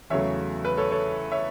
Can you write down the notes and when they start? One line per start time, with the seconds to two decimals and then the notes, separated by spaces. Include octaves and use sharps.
0.10 E2 C#3 F#3 A3 C#5 E5
0.65 B4
0.77 A4 C#5
0.91 A4 C#5
1.32 C#5 E5